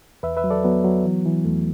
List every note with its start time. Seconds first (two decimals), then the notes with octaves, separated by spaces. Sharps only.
0.23 E2 B4 E5
0.37 B4 E5
0.44 F#3
0.50 A4 D5
0.64 F#3 B3
0.85 F#3
1.05 E3
1.26 E3
1.45 E2 A3